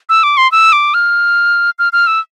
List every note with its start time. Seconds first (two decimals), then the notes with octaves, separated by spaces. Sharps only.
0.09 E6
0.23 D6
0.37 C6
0.52 E6
0.73 D6
0.94 F6
1.79 F6
1.93 F6
2.07 E6